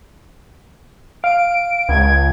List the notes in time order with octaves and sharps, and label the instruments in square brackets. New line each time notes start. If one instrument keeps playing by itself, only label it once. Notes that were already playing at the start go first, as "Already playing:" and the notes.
[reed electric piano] F5 [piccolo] D7
[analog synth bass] C#2 [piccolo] G#6